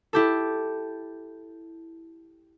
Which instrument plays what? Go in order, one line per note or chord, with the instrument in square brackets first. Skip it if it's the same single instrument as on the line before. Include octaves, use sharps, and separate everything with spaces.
[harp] E4 G4 A4